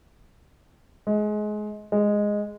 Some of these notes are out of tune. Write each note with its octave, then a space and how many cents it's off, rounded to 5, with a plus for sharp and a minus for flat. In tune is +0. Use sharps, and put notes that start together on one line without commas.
G#3 +25
G#3 -5